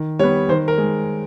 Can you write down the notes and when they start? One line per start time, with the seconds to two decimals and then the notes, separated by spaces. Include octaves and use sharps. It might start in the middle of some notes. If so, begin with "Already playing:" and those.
Already playing: D#3
0.19 G3 C#5
0.23 B3
0.49 D#3 C5
0.68 A#4
0.78 G#3